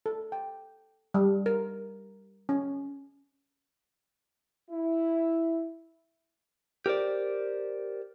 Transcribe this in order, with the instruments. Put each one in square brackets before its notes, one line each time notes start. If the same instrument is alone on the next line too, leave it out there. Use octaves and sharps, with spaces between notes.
[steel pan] A4
G5
G3
A#4
C#4
[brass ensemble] E4
[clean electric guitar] G4 A#4 C5 D5